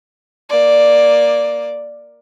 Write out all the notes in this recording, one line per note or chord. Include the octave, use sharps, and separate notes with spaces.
A#3 D5